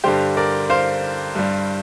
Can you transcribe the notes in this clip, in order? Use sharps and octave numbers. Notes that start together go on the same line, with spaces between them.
G2 D3 G3 G4 C5
A#4 D5
C5 F5
G2 G3